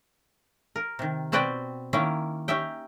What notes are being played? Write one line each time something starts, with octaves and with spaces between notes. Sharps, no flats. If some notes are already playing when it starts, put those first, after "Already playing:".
A#4
C3 D#3
B2 C4 F#4 B4 D5 G5
D#3 A#3 C#4 E4
C#4 D#4 G4 E5 G5